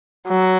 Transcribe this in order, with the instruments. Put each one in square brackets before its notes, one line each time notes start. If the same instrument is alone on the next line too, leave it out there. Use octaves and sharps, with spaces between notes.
[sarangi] F#3